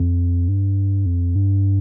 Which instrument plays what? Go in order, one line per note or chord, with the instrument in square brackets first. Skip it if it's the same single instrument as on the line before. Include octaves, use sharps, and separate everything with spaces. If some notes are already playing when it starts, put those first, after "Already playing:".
Already playing: [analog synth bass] F2
G2
F2
G2